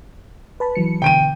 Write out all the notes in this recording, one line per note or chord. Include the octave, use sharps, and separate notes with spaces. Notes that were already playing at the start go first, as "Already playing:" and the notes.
B4 A5 B5
E3 F#3 C#7
B2 D3 E3 G5 D7 D#7